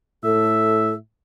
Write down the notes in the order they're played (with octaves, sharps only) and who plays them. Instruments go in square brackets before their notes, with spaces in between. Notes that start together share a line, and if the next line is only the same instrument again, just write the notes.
[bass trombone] A2 [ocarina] A4 [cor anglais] E5